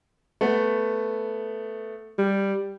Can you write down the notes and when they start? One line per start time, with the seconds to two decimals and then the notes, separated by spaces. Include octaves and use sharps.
0.41 A3 B3
2.18 G3